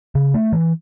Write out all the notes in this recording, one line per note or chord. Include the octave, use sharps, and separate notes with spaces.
C#3
A3
E3